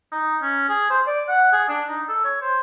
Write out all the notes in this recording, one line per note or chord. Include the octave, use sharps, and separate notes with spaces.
D#4
C#4
G#4
C5
D5
F#5
G#4
D4
D#4
A4
C#5
C5